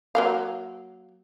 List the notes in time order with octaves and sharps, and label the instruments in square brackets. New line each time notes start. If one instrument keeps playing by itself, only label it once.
[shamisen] F#3 A#3 F5